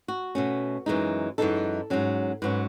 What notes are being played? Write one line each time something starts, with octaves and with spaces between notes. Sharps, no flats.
F#4
B2 A3 C#4
F#2 E3 G#3 D#4
F#2 E3 G#3 D#4 A4
G#2 F#3 C#4
G#2 F#3 C#4 B4